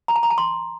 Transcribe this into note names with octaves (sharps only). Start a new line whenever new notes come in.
A#5
A5
A#5
A5
C6